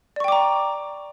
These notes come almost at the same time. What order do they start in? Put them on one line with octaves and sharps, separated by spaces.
D5 C#6 G5 D6 A#5